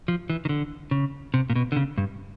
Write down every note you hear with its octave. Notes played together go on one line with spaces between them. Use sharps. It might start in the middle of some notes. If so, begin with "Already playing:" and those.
F3
E3
D#3
D3
C#3
C3
A#2
B2
D3
C#3
G2